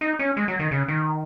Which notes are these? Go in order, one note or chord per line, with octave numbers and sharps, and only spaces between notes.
D#4
C#4
G#3
F#3
D#3
C#3
D#3